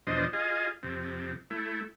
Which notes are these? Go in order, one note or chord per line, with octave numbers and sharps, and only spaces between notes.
E2 B2 F3 D4 C5 D#5
F4 G#4 D#5
F2 C3
A3 E4